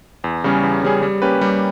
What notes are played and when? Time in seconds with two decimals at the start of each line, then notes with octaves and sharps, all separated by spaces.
0.24 E2
0.44 C#3 G3 C#4 G#4
0.63 E2
0.83 C#3 G3 C#4 G#4
1.03 G3
1.22 A#3 C#4 G4 B4
1.41 G3